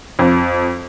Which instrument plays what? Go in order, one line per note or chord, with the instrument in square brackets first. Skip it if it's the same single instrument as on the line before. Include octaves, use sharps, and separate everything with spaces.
[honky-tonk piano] F2